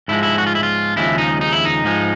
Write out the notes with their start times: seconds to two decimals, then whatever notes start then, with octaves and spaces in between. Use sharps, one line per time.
0.08 G#2 F3 G#3 E4
0.23 E4
0.38 F#4
0.47 F4
0.55 E4
0.63 F4
0.96 D#2 C#3 F3 G#3 E4
1.18 D#4
1.41 D#4
1.52 E4
1.65 D#4
1.84 G#2 F3 G#3